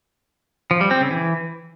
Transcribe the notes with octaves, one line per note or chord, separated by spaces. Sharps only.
F3
G3
C4
C#3
E3